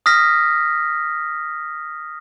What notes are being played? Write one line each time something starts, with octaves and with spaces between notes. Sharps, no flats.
D#6 F6 A#6 B6